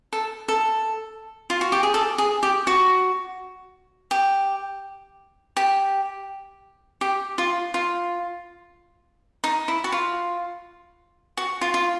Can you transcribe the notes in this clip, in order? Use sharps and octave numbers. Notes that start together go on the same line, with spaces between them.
A4
A4
F4
F#4
G4
G#4
A4
G#4
G4
F#4
G4
G4
G4
F4
F4
D#4
E4
F#4
F4
F#4
F4
F4